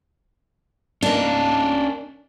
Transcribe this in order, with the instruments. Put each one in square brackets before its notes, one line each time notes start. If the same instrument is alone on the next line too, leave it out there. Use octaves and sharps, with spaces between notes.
[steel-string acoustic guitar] A#3 D4 [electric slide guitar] C#4 D5 D#5